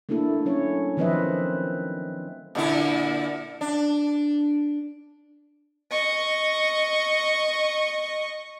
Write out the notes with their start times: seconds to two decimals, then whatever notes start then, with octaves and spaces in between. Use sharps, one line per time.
0.09 A3 A#3 D4 E4 A4
0.45 F#3 C#4 C#5
0.97 D#3 F3 C4 B4 D#5 E5
2.55 A#2 D3 E4
3.61 D4
5.90 D#5 C#6